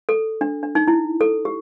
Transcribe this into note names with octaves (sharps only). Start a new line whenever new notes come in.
A4
D4
D4
D#4
E4
A4
G4